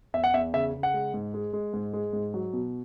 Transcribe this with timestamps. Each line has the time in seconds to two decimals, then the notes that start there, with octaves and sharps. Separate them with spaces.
0.14 E2 E5
0.24 F#5
0.34 E2 E5
0.54 C#3 E5
0.74 C#3
0.83 F#5
0.94 G#3
1.14 G#2
1.34 G#3
1.53 G#3
1.73 G#2
1.94 G#3
2.13 G#2
2.34 F#3
2.53 B2